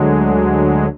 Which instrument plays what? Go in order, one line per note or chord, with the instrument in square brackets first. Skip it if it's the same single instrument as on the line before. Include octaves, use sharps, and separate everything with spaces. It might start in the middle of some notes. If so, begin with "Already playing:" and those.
Already playing: [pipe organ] D2 D3 F#3 G#3